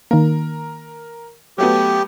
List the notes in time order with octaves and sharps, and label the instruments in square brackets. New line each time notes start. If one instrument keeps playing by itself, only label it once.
[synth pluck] D#3 A#3 [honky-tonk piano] A#4
[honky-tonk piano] F#3 A3 B3 [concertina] G4